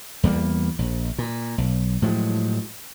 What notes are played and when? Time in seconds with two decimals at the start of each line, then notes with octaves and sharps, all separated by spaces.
0.23 E2 G3 G#3 A#3
0.79 A#1
1.18 A#2
1.58 B1
2.02 A2 F3 F#3 G#3